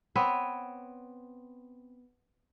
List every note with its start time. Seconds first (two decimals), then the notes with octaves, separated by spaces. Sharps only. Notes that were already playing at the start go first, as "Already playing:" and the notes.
0.15 B3 C4 B4 C#5